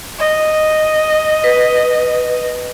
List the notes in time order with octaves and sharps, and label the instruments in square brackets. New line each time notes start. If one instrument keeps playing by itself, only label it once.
[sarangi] D#5
[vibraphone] B4